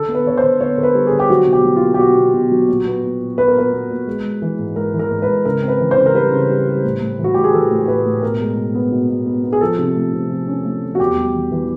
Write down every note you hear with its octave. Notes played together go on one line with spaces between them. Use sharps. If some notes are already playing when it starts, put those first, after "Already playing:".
Already playing: D3 A4
B3
B4
D3 C#5
C5
D3
B3 C#5
D3 A#4
B4
G3
G#4
D3
G4
F#3 F#4
B2
G4
F#3
F4
A#3
G4
B2 F#4
B2
B2
F#3
A#2
B3
A#2
A#2
B3 B4
A#4
A#2 B4
B3
A#2
G#3
G#3
E3
G#2
G#3 A#4
E3
A#4
G#2
B4
G#2
C#3 A#4
C4
B4
E3
C5
C#3
A#4
G3 B4
C#3
G3
G3
A2
A2
E3
F#4
A2 G4
G#4
E3 A4
A2
A2 B4
A2
B2 A#4
G#3
B2
B3
B2
B2
B3
B3
G#4
F3 A4
C3
A3
C3
F3
C#4
A3
F3
F#4
E2 G4
G3
E3
E3